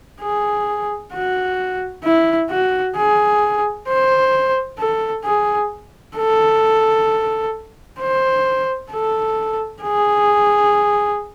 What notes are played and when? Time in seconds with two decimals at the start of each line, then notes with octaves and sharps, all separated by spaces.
0.21 G#4
1.13 F#4
2.04 E4
2.50 F#4
2.96 G#4
3.88 C5
4.79 A4
5.25 G#4
6.17 A4
8.00 C5
8.92 A4
9.83 G#4